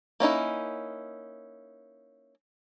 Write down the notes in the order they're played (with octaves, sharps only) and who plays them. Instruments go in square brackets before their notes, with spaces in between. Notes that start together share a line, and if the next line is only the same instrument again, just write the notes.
[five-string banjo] A#3 C#4 D#4 E4